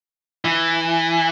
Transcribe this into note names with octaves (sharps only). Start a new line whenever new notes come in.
E3